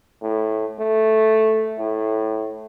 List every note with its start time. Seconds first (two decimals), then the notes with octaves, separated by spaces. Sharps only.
0.22 A2
0.79 A3
1.78 A2